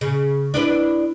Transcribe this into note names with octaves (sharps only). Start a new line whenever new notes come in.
C#3
D4 E4 B4